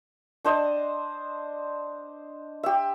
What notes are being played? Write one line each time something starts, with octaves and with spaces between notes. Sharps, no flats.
D4 C5 D#5
G4 E5